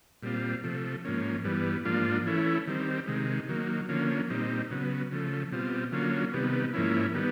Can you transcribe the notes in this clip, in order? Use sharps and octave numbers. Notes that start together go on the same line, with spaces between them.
A#2 G3 C4 F4
C3 F3 A3
G#2 F3 A#3 C#4
G2 E3 G3 B3
G#2 F3 A#3 D4 F4
E3 A3 C#4 E4
D#3 G3 C4
C3 D#3 G#3
D#3 F#3 A#3
D3 F3 A#3 C#4
A#2 G3 C4 D#4
C#3 F#3 B3
C#3 F3 A3
B2 G3 C4 F4
D3 F#3 A#3 C#4 F4
C3 D#3 G3 B3
G#2 F3 A#3 C#4 E4
D#3 G3 B3